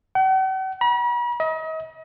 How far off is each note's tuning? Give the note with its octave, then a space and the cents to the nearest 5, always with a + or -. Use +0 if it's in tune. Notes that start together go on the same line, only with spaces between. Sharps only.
F#5 +45
B5 -45
D#5 +40